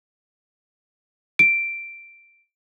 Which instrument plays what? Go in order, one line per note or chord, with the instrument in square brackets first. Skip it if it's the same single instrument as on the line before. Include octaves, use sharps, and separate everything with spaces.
[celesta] D7